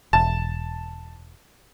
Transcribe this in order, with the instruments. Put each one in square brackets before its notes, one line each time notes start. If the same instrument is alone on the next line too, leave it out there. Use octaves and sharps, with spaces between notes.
[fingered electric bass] E1 [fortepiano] A5